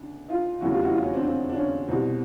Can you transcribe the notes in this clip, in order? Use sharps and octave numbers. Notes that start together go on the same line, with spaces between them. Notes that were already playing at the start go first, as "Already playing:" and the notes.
Already playing: C#2 D4
D#4 F4
F1 E2 C#3 F#3 A3 E4 F#4
F4 G4
E4 F#4
D#4 F4
C#4 D#4
C4 D4
C4
D4
C#4
C2 B2 G3 C4